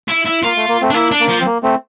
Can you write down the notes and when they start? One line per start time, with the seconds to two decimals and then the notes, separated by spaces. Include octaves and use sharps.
0.08 E4
0.25 E4
0.43 A#3 F4
0.56 A3
0.68 A#3
0.82 A3 C4
0.90 D4
0.94 A#3 E4
1.12 D4
1.20 A#3
1.29 F3
1.40 C4
1.46 A#3
1.63 A3 C4